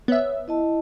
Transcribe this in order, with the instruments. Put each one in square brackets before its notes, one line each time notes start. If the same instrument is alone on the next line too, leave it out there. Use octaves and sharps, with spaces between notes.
[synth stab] B3 E5 [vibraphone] C#5
[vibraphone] E4 D#5 A5